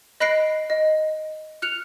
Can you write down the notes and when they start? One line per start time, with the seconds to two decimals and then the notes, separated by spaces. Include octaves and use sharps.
0.20 D#5 B5 F#6 A#6 C7 D7
0.70 D#5
1.62 F6 F#6 C#7 F7